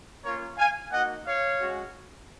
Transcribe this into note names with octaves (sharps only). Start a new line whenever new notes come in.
A#3 C#4 F4 A#4 C#5
F5 G#5
A#3 D#4 F#4 D#5 F#5
C#5 F5
G#3 C#4 F#4